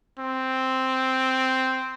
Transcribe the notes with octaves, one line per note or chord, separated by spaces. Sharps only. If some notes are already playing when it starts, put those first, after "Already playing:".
C4